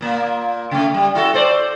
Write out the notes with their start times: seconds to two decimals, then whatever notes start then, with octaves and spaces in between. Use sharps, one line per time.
0.01 A#2 A#3
0.71 C#3 A3
0.94 G3
1.15 E4 F#4 A4
1.34 A4 C5 D5